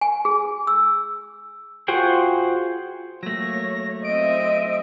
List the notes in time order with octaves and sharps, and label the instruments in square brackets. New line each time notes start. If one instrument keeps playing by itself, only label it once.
[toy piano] G#5
G#4
E6
[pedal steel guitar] F4 F#4 G#4 C5 G5
[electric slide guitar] F#3 A3 [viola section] A#3 C#5 [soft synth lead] A#6
[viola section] C4 E5 [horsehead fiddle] D#5 [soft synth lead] D7